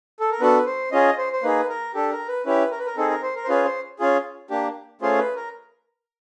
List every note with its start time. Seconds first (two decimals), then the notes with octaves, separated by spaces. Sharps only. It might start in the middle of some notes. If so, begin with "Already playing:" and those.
0.20 A4
0.31 A#4
0.40 B3 D4 F#4 A4 B4
0.66 C5
0.92 C#4 F4 G#4 D#5
1.18 C5
1.32 C5
1.43 A#3 D#4 G#4 B4
1.69 A#4
1.94 D4 G4 A4
2.12 A#4
2.28 B4
2.46 C#4 E4 G4 B4
2.71 A#4
2.79 B4
2.86 A#4
2.97 C4 D#4 G#4 A4
3.10 A#4
3.23 C5
3.35 A#4
3.44 C5
3.48 C#4 F4 G#4 B4
3.65 C5
3.99 C#4 F4 G#4
4.50 A#3 D4 G4
5.01 A3 C#4 F4 G#4 C5
5.18 B4
5.36 A#4